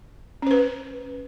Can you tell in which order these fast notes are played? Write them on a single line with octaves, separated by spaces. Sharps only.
C#4 C5 B4